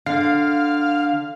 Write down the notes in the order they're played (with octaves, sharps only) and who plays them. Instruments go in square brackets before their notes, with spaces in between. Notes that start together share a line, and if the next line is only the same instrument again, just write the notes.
[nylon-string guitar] D3 [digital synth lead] F5